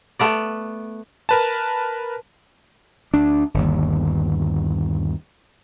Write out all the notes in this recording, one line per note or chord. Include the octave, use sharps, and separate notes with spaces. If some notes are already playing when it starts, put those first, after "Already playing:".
A3 B3 D5
A#4 B4 A5
D2 D4
G1 D#2